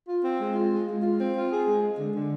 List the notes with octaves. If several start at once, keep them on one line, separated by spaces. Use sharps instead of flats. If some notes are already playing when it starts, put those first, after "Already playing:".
F4
C4
G#3
F4
G#3
G#3
F4
C4
F4
G#4
G#3
G#3
D3
D3